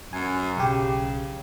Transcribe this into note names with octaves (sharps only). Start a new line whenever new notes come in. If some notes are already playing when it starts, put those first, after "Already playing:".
F#2 G#5
B1 C#3 G4